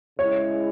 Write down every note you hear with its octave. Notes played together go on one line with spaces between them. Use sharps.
C#3 G#3 E4 G#4 C#5